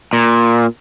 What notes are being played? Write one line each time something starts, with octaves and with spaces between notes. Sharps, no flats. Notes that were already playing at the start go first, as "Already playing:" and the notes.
A#2